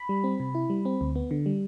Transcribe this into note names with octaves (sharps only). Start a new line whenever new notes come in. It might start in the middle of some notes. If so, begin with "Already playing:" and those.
Already playing: B5
G3
C4
C3
E4
G3
C4
D2
B3
D3
G3